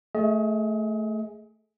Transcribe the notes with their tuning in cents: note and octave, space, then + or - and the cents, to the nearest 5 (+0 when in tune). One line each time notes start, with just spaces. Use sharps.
A3 +0 G#4 +0 D#5 +35